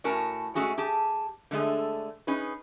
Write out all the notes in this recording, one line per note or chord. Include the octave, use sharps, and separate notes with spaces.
A2 C#4 F#4 A#4 G#5 A5
G#2 A3 C#4 F#4 G#4
G4 G#4 A5
D3 G#3 A3 G#4
C#4 D#4 G#4 B4